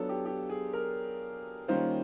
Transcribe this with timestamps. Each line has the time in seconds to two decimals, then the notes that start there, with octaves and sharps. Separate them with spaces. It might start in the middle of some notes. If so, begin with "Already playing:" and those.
Already playing: F#3 B3 D4 F4 A4 C#5
0.09 G4
0.25 G4
0.49 G#4
0.73 A#4
1.68 D#3 G3 A#3 C#4 F4 C5